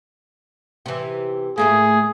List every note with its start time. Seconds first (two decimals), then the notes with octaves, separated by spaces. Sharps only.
0.86 C3 E3
1.58 A2 A3 A#3 G#4